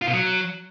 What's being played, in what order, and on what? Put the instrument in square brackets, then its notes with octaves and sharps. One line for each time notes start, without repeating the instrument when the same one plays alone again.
[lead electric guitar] F4
B2
F#3